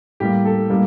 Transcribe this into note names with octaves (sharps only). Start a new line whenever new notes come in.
A2 G3 A#3 G4
A4
A2 G3 A#3